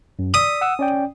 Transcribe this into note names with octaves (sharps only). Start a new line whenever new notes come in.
F#2
D5 D#6 E6 B6
F#5 E6
C#4 D5 G5